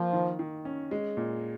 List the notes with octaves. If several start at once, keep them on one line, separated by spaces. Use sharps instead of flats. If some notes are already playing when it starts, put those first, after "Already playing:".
Already playing: F3 A#3
D#3
D#3
C#4
G#3
A#2